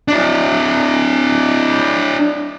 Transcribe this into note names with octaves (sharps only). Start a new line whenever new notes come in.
D4 E4